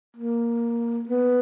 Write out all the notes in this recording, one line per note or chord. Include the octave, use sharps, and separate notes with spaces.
A#3
B3